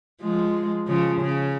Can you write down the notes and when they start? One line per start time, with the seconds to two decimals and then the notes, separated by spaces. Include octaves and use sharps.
0.22 F3 G#3
0.87 C#3 F3
1.21 C#3